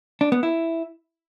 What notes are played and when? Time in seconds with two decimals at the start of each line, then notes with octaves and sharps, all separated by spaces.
0.21 D4
0.32 B3
0.43 E4